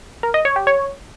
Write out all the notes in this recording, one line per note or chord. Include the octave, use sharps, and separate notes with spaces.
A#4
D#5
C#5
G4
C#5